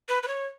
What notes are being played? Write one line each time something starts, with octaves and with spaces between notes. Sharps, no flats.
B4
B4
C#5